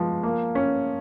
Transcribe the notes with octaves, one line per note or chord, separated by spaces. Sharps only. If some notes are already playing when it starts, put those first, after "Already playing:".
Already playing: F3 G#3 B3
A#3
C#4